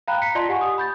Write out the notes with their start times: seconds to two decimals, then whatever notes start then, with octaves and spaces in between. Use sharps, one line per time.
0.08 F5 G5 A#5 B5 F#6
0.22 A#5 B6 C#7
0.35 F4 D5 D#5 A5 C6
0.49 G4 F#5 G#5 C#6
0.61 D#6
0.78 B5 G6 A6